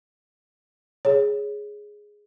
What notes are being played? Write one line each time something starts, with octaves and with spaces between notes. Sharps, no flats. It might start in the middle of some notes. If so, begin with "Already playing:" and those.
G#4 C#5